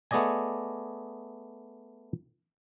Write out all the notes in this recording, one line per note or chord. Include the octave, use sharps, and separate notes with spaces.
A3 B3 G#4 D5 D#5 G#5